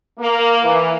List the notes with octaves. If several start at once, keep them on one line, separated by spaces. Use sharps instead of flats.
A#3
E3